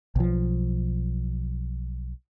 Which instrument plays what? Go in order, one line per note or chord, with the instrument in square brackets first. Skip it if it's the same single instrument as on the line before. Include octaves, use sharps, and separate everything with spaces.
[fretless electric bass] B1 F3